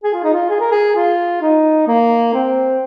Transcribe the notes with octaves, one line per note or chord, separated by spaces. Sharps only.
G#4
F4
D#4
F4
G#4
A#4
G#4
F4
D#4
A#3
C4